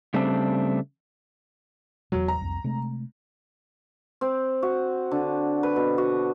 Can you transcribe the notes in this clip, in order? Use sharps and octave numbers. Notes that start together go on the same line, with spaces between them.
C#3 G3 A3 C4 D4
E1 E2 F#3
A#5
C2 F2
C3 G#3 A3
C4
F#4
D3
B4
B2
F#4